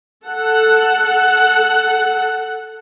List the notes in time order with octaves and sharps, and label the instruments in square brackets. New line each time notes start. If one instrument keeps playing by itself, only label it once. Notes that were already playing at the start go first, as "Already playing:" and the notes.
[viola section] A4 F#5